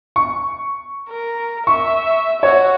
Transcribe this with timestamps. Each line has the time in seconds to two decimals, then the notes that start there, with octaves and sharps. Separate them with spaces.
0.16 C#6
1.09 A#4
1.67 E5 C#6
2.43 F#4 C#5